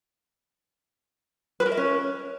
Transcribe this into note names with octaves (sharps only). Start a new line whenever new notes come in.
B4
A#4
E5
C#4